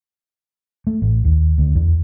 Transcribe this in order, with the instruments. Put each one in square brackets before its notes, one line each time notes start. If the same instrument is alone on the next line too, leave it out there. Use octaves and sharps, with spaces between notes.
[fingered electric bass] A3
A1
D#2
D2
E2